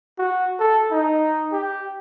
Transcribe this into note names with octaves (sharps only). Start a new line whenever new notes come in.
F#4
A4
D#4
G4